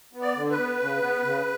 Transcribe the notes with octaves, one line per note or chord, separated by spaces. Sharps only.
B3
D5
D3
B4
B3
C#3
B3
C#3